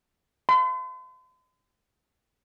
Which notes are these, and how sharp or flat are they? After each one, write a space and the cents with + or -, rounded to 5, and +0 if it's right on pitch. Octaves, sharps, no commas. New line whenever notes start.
C6 -45